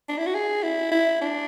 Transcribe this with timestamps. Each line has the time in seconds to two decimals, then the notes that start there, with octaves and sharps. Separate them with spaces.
0.09 D4
0.18 E4
0.27 F#4
0.35 G#4
0.63 E4
0.91 E4
1.21 D4